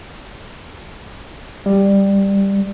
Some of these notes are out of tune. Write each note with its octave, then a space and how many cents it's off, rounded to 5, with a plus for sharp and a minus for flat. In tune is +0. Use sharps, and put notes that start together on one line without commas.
G3 +10